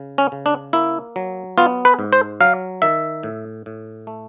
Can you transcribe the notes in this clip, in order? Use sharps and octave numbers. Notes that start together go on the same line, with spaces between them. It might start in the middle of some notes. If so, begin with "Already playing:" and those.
Already playing: C#3
C#4
C#3
D4
A#3 E4
F#3
B3 F4
B4
G#2
C5
F#3 F5
D#3 E5
A2
A2
A3